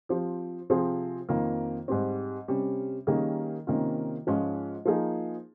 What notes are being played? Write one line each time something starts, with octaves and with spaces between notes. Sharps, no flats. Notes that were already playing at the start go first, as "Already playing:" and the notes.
F3 C4 G4
C3 F3 C4 F4 G#4
F2 D#3 A#3 F4
G#2 G3 C4
C3 G3 C#4
D#3 G3 A#3 C#4 G#4
C3 D#3 A#3 C#4 F4
G#2 F3 G#3 C#4 F4
F3 A#3 D#4 G#4